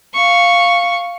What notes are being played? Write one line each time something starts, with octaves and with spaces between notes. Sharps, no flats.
F5 C#6